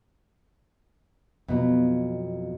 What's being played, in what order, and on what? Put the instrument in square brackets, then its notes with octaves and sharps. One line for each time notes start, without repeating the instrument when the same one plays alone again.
[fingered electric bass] F2 [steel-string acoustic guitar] B2 F#3